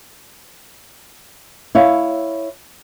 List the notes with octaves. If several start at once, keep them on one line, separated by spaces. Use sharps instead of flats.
E4 C#5 F5